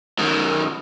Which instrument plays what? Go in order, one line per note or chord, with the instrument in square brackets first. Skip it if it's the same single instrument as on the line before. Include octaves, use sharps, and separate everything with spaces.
[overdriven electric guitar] F#2 D#3